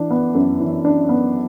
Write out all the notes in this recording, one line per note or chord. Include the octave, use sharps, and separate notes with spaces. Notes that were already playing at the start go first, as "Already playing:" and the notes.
Already playing: E3 D4
B3
F#2
E3
D4
B3